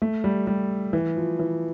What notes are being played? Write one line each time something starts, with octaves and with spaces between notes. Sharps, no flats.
A3
G3
G3
E3
F3
E3